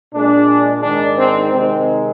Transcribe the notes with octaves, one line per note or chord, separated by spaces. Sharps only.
A#2 G#3 D4
G#2 D#3 G#3 D4
C4
C3 D#3 G#3 C4